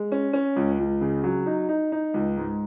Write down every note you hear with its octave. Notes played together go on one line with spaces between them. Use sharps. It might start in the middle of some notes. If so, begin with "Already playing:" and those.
Already playing: G#3
C#4
C#4
C#2
C#2
C#3
F#3
D#4
D#4
D#4
C#2
G#2